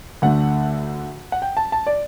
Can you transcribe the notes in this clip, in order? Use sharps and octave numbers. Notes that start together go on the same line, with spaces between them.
D2 D3 A3 F#5
F#5
G5
A5
A5
D5